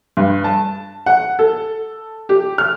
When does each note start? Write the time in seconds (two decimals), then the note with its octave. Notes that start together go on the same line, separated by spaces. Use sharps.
0.17 G2
0.44 A5
1.06 F#5
1.39 A4
2.29 G4
2.58 F6